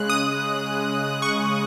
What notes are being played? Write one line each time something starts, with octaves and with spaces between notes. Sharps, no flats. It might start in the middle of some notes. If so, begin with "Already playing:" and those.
Already playing: C#3 G#3 F#6
D#6
C#6